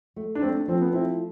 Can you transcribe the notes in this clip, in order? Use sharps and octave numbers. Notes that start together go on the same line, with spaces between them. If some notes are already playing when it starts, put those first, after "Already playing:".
A3
D4
A3 C4
D4
F3 C4
B3
C4 E4